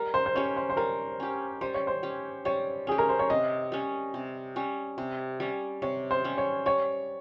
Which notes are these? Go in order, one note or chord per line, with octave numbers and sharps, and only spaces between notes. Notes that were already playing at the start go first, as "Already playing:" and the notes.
Already playing: G3 A#4
C5
C5
C#4 G4 C#5
C5
C5
G3 A#4
C#4 G4
G3 C5
C#5
C5
C#4 G4
G3 C#5
C#4 G4 G#4
A#4
C5
C#5
C3 D#5
G3 C#4
C3
G3 C#4
C3
G3 C#4
C3 C#5
C5
G3 C#4
C#5
G3 C#5